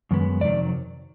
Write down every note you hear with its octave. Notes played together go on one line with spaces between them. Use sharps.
F#2 D#3 G#3 B3
F2 C3 D#3 F#3 D5